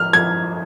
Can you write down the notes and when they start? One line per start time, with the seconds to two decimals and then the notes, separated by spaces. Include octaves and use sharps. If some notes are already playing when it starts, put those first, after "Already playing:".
Already playing: F3 F6
0.13 F3 G#6